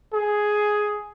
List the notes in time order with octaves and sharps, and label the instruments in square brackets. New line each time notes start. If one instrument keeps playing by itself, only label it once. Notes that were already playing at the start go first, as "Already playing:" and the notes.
[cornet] G#4